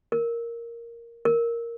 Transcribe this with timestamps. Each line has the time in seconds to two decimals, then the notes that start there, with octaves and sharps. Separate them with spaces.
0.12 A#4
1.25 A#4